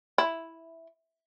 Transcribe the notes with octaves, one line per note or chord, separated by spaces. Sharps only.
E4